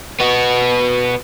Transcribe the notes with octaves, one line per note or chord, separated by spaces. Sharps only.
B3 F#4